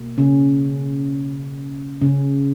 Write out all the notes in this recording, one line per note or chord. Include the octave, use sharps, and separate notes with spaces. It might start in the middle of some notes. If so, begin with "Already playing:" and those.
Already playing: B2 A#3
C#3 C#4
C#3 C#4